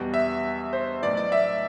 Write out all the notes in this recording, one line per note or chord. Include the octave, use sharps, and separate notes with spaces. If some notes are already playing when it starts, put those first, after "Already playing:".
Already playing: E2 B2 G3
E5
C5
B1 A2 E3 D5
D5
E5